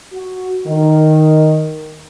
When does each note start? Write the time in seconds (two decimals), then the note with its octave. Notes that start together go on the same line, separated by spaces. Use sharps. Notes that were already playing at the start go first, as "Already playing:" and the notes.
0.13 F#4
0.67 D#3